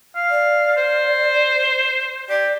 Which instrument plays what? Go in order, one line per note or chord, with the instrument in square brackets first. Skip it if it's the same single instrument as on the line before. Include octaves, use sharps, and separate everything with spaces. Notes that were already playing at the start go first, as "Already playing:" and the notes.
[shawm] F5
[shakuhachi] D5
[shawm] C5
[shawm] G4 [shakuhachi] D5